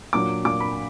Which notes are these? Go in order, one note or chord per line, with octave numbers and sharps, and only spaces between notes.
A#2 F#3 A#3 D4 D6
A#2 F#3 A#3 D4 D6
B5